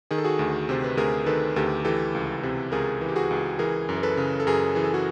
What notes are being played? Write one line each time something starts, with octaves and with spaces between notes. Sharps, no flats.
D#3 G#4
A4
F#4 G#4
D2
C3 C5
B4
D2 G#4 A#4
D#3 A4 B4
D2 G4 A4
E3 G4 A4
C#2
C3
C#2 G#4 A#4
E3
G4
F#4 G#4
C#2
E3 G#4 A#4
F#2
A#4
A4 B4
C#3
A4
F#2 G#4 A#4
E3 G#4
A4
F#4 G#4